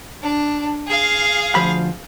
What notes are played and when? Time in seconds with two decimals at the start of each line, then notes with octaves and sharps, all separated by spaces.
0.23 D4
0.87 G#4 F5
1.55 D2 F3 B5